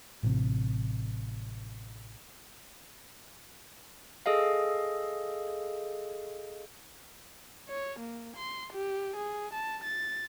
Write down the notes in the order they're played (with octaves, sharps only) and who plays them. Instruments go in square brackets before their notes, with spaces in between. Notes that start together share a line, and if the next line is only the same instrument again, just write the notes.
[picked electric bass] A1 C3
[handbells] G#4 A4 D#5 F5
[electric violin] C#5
A#3
C6
G4
G#4
A5
A6